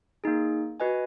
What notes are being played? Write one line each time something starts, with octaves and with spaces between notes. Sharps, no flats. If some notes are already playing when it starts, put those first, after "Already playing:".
A#3 D#4 G#4
F#4 B4 D#5 G#5